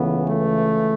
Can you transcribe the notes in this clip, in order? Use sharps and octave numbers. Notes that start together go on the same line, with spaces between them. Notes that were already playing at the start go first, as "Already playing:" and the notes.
Already playing: C#2 C#3 E3 A3 B3
A3